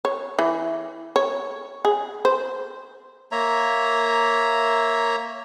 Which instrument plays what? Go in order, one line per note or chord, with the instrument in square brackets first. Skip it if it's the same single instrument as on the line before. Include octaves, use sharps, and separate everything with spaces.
[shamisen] C#5
E3
C#5
G#4
C5
[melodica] A#3 C#5 E5 A#5